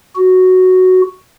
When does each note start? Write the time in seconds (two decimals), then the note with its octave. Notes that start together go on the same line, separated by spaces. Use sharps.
0.16 F#4